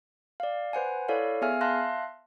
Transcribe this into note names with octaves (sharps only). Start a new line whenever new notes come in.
D5 F5
B4 C5 F#5 G#5
E4 A4 C#5 D5 F5
B3 G#4 E5 F5 G#5 F6
E5 F5 A5 C6 F#6 A#6